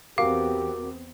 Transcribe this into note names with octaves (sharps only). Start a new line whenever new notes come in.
E2 B3 C4 F#4 G4 A#4 F5 D6